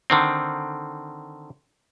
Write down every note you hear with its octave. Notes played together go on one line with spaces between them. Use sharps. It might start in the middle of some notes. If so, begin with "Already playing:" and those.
D3 D#3 C4